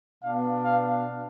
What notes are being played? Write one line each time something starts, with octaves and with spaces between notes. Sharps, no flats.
B2 B3 D4 F5
F5